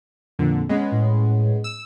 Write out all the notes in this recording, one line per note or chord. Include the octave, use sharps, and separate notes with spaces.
F2 A#2 D3
G#3 B3 C#4
A2
E6